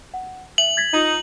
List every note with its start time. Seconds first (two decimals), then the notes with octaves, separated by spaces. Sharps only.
0.14 F#5
0.58 E5 F#7
0.77 G#6 A6 B6
0.94 D#4 F4 D#5